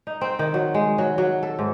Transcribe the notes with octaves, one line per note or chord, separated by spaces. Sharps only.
D#4
C4
D#3
F#3
G#3
F#3
F#3
A4
G#2